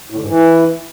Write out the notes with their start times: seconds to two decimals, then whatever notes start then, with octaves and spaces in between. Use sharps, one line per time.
0.10 A2
0.16 D3
0.22 G#2
0.28 E3